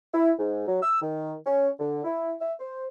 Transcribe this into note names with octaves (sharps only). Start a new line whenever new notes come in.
E4
G#2
F#3
E6
D#3
C#4
D3
E4
E5
C5